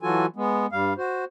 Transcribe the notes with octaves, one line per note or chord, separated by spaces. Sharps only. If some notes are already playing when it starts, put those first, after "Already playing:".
E3 F#3 F4 F#4 A4 G#5
G#3 B3
G2 G3 F5
F#4 C5